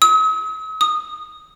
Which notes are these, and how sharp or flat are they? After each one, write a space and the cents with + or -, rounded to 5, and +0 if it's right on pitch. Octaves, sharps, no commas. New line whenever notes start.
D#6 +45
D#6 -15